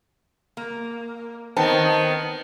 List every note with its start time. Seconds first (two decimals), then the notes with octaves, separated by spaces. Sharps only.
0.57 A#3
1.57 D#3 B3 C4 A5